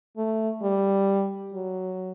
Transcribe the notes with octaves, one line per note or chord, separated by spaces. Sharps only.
A3
G3
F#3